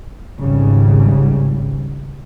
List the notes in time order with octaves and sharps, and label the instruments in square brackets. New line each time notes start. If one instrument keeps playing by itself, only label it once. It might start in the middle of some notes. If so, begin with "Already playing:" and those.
[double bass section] G#1 C#2 G#2 C#3 G3